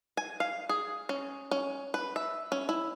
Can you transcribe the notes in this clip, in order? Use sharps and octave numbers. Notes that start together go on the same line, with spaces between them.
G#5
F5
G#4
C#4
C#4
B4
E5
C#4
E4